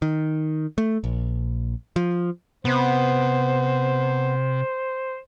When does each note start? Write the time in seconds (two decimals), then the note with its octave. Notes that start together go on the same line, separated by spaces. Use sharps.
0.02 D#3
0.78 A3
1.04 A#1
1.96 F3
2.65 C3 B3 C5